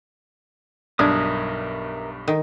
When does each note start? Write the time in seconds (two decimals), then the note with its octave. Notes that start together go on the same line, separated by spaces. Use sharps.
0.99 B1 G2 D4 A#4 E5 D#6 G#6
2.28 D#3